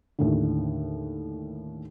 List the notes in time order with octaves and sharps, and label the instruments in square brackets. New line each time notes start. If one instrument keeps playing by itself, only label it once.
[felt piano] D#2 A2 D3